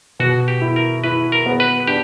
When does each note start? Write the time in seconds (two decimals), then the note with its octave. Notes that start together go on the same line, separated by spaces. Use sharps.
0.19 B2 F#4
0.48 G4
0.61 E4
0.76 A#4
1.04 E4 B4
1.32 A#4
1.46 B3
1.60 B4
1.87 D4 G4